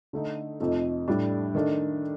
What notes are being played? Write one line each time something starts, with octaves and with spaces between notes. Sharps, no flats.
D3 A3 D#4
F2 C3 F3 A3 D#4
A2 G3 D4
D#3 A3 D4